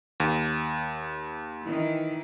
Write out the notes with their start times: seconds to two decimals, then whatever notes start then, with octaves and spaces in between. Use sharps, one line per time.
0.20 D#2
1.63 D#3 E3